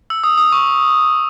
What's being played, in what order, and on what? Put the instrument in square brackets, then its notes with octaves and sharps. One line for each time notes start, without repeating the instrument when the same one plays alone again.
[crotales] E6
D#6
D#6
C#6